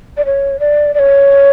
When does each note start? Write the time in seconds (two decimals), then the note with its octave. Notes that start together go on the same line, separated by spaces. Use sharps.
0.17 D5
0.25 C#5
0.59 D5
0.94 D5
0.99 C#5